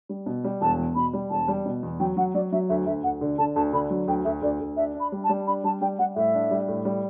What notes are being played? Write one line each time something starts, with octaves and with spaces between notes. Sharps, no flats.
G3
B2
G3
E1 A5
E2
B2 B5
G3
E1 A5
G3
B2
E2
F#3 G5
F#3 F#5
F#3 D5
F#3 E5
D2 E5
D2 E5
D2 F#5
D3
D3 A5
D2 A5
D3 B5
F#3
D2 G5
D2 E5
D2 D5
D2
D4 E5
D4
B5
G3
A5
G3
D4 B5
G3 A5
G3 G5
G3 F#5
A2 E5
D4
G3
A2
G3